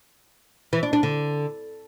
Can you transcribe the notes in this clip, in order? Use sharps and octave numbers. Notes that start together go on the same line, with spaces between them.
E3
D4
D4
D3